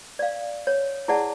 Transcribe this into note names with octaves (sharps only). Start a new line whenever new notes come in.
D5 F5
C#5
E4 G#4 D5 F#5 A5